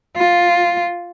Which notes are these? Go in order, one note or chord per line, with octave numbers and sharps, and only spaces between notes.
F4